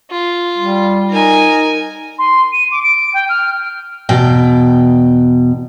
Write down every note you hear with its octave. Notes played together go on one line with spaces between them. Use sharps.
F4
G3
D#4 A#4 G#5
C6
D#7
D6
D7
G5
F6
E2 B2 G5